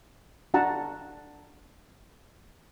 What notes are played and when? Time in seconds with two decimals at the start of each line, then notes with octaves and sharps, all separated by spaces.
0.54 D4 F#4 F#5 A5 A#5